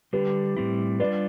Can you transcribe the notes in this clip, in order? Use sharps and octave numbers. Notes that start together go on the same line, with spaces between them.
D3 G3 D4 G4 B4
A2 G3 C4 E4
G3 D4 F4 B4 D5